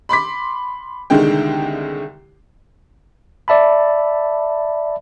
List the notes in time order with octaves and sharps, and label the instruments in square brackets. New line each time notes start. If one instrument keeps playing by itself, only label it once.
[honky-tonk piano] B5 C6 D6 B6
C2 D3 D#3 G#3 G5
[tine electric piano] D5 E5 A5 B5